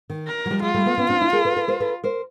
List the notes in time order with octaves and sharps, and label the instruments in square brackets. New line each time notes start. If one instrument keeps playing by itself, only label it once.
[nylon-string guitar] D#3
[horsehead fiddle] A#4
[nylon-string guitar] F#3
F3 G3
[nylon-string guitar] F#3 G#3 [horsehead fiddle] F4
[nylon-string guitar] G3 A3
A3 B3
B3 C#4
C4 D4
D4 E4
G#4 A#4
A4 B4
A4 B4
A#4 C5
A4 B4
A#4 C5